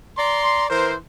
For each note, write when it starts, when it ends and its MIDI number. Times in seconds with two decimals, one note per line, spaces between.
0.18 0.65 74
0.18 0.65 82
0.18 0.65 84
0.70 0.95 52
0.70 0.95 70
0.70 0.95 72